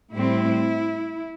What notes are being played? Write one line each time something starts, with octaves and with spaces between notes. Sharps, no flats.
A2 G3 C4 E4